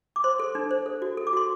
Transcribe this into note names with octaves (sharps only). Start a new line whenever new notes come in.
D6
C5 C6
A4
D4
C5
A4
F#4
A4
D6
F#4 C6